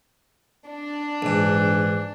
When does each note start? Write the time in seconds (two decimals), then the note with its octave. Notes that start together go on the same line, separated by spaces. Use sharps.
0.68 D4
1.22 A#1 G#2 E3